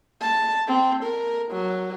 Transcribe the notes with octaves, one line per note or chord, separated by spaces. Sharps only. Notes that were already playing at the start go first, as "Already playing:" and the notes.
A5
C4
A#4
F#3